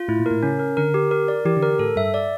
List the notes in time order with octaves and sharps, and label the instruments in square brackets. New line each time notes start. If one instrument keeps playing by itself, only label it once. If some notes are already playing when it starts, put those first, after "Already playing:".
Already playing: [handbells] F4
[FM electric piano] A2 [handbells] E4
[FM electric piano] A#2
[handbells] A#4
[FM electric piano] A2
[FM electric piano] C#3 [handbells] C#4
[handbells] A#4
[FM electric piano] D3 [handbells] A#4
[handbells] G4
A#4
D5
[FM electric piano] E3 [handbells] G4
[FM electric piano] D3
[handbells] A#4
[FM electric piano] A2 [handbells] A4
[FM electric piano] G2 [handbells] E5
[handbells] D5